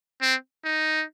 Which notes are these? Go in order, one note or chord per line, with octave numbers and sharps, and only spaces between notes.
C4
D#4